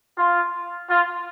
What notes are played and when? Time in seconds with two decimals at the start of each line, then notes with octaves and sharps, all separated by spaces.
0.17 F4
0.89 F4